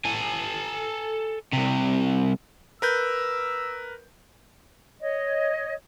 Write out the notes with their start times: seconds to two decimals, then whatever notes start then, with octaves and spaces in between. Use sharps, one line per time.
0.05 A4 G#5
1.53 C2 C3
2.82 A#4 B4 E6 G6
5.01 C#5 D#5